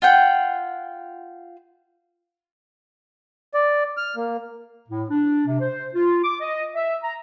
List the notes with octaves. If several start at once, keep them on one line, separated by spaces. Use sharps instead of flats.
F4 F#5 G5
D5
F6
A#3
A2
D4
C3
C5
F4
D6
D#5
E5
A#5